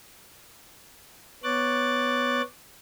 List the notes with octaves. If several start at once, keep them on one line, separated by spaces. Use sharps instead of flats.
B3 C#5 D6 F#6 A6